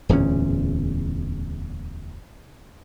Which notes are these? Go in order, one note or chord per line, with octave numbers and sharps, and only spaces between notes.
D1 E2 A#2 C#4